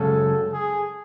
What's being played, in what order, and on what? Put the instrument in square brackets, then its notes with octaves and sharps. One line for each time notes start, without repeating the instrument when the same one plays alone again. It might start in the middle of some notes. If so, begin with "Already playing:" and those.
Already playing: [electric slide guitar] F#2 C#3 G#3 C#4 [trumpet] A4
[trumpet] G#4